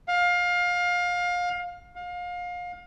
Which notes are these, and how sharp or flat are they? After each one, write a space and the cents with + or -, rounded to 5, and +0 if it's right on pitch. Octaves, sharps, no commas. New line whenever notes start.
F5 +25
F5 +30